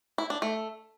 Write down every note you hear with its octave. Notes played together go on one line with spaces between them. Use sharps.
E4
D4
A3